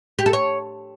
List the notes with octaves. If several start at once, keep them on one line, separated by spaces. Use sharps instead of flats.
G4
A4
C#5